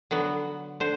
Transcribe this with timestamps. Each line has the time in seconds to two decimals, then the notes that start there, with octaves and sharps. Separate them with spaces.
0.11 D3 F#3 B3
0.80 D3 C5